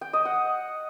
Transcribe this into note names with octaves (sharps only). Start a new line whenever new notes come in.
G5
D#5
F#5